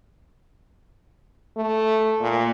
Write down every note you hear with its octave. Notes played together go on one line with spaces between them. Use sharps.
A3
A#2